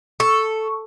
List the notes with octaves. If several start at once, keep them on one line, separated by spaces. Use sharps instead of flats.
A4 C#6